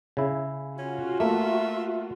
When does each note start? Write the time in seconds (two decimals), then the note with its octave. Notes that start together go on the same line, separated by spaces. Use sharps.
0.17 C#3 E4
0.79 C#4 F4 F#4
1.20 A3 A#3 E5